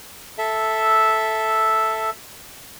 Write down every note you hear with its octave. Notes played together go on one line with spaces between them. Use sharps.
A4 E5